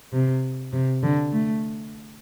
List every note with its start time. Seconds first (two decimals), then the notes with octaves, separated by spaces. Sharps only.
0.13 C3
0.73 C3
1.03 D3
1.32 A3